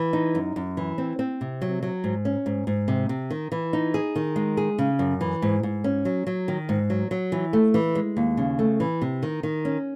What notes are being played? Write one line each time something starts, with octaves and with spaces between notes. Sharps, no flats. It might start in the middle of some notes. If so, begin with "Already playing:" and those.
Already playing: E3
D#4
F#2
F#2
E3
C4
C4
C3
F#3
F#3
G#2
C#4
G#2
G#2
C3
C3
D#3
E3
D#4
G#4
D#3
G#3
G#4
C#3
F#2
E3
G#2
G#2
C#4
F#3
F#3
D#3
G#2
F#3
F#3
E3
A3
E3
G#3
D#2
C#3
A3
E3
C3
D#3
D#3
C#4